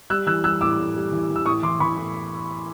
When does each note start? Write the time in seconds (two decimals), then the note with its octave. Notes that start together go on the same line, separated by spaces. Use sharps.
0.10 G3 E6 F#6
0.27 E3 E6 F#6
0.44 G3 E6 F#6
0.61 A2 D6 E6
0.79 A2
0.96 G3
1.12 E3
1.30 E3
1.36 E6
1.46 A2 C#6 D#6
1.63 E3 C6 D6
1.80 E3 B5 C#6
1.97 A2